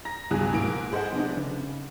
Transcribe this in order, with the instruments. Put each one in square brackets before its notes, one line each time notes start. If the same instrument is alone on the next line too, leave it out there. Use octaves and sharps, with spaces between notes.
[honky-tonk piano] A#5 A#6
C#2 G2 B2 G#4 G#5 F#6
G#2 A#3 D7
G#4 A4 C5 D#5 E5 F#5
C3 B3 D4 D#4
C#3